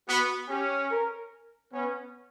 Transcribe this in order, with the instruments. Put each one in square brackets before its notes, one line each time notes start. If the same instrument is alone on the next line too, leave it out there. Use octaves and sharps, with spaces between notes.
[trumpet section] B3 [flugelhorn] F#4
[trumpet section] C#4 [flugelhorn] G4
[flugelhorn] A#4
[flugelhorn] B3 [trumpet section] C#4